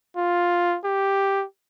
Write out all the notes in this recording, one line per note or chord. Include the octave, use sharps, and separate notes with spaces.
F4
G4